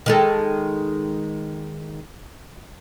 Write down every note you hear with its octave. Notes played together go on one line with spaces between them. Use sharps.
D#3 G#3 A4